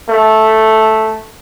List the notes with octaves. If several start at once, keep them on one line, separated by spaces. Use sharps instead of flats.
A3